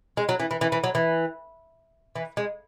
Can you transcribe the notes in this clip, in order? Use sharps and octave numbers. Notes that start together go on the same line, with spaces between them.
G#3
F#3
E3
E3
E3
E3
F#3
E3
E3
G#3